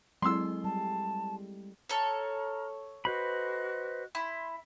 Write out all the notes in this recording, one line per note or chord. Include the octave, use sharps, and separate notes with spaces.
F#3 G#3 C4 E4 A4 C6 E6
G3 A5
A4 C#5 A#5 F6
F#4 B4 C5 D#5 B5 F#6
E4 C6